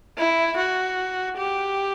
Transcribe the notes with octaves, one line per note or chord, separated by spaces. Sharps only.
E4
F#4
G4